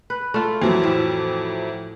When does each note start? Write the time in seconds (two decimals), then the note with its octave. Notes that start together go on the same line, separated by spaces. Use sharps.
0.10 B4
0.34 A3 F4
0.62 F2 E3 F#3
0.83 A2 E5